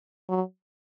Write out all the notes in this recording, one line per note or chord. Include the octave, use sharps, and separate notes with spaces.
F#3